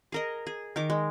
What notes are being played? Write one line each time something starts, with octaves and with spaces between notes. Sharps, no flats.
G#4 A#4 D#5
G#4
D#3 A#4 D6
G#3